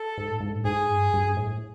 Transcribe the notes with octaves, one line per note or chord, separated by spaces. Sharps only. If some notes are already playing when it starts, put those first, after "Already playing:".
Already playing: A4
G#2
A2
G#2
A2
G#2 G#4
G2
G2
A2